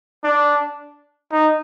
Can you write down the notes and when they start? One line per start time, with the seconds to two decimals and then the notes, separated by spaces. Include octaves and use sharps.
0.24 D4
1.32 D#4